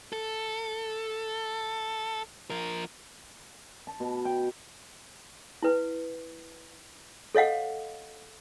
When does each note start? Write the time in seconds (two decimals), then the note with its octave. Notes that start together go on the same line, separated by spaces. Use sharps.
0.13 A4
2.50 F3 A#4
3.87 A5
4.00 B2
4.25 G5
5.62 E4 B4
7.35 A4 C#5 D#5 F5 F#5